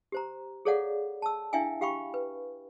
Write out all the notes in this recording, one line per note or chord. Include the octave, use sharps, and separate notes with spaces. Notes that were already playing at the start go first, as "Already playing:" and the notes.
G4 C5 A#5
G#4 A4 C#5 D5 F5 F#5
A5 E6
D4 E4 E5 F5 G5 G#5
G4 F5 G5 B5 C#6
B4